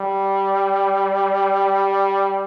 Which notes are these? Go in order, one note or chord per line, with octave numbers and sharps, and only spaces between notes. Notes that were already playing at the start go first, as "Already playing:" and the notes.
Already playing: G3